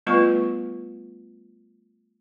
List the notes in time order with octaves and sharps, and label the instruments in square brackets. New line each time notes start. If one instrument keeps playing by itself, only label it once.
[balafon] G3 A3 B3 F4 B4 C#6